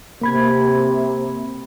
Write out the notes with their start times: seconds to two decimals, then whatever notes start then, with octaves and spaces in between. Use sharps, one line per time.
0.21 C3 A#3 B5 G#6